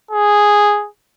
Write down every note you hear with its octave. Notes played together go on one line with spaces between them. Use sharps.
G#4